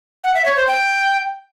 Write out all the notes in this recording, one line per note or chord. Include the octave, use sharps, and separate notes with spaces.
F#5
E5
C#5
C5
G5